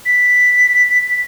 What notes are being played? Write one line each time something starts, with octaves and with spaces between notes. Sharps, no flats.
B6